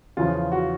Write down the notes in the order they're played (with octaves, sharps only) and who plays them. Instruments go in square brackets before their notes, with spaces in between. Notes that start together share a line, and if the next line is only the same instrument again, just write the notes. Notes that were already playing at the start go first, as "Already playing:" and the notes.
[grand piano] E2 C#3 F3 F4
F#4